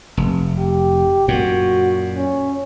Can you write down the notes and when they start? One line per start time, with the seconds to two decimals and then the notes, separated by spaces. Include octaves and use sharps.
0.17 F1
0.58 G4
1.28 F#2 A#2 F#4
2.17 C#4